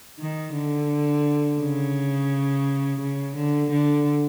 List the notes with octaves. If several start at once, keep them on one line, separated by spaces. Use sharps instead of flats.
D#3
D3
C#3
C#3
D3
D3